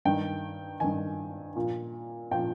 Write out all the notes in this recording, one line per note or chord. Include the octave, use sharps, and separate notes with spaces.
G2 D#3 G5
G2 D#3 G#5
A#2 F3
A#2 F3 G5